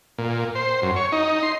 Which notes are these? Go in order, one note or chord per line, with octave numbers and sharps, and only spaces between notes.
A#2
C5
F#2
C#5
D#4
C6